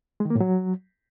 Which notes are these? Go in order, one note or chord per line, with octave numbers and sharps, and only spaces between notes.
G#3
D#3
A#3
A2
F#3